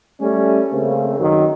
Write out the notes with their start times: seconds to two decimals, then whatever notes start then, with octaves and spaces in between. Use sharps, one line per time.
0.21 G3 A3 C#4
0.71 C#3 A3 A#3 C4
1.19 F#2 D#3 F#3